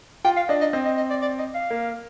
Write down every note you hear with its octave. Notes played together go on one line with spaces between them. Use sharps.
F4 G5
F5
D4 D#5
D#5
C4 D#5
D#5
D#5
D5
D5
D#5
F5
A#3